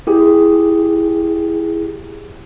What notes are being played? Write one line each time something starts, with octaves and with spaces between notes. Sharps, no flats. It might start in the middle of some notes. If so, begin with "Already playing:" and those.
E4 G4 G#4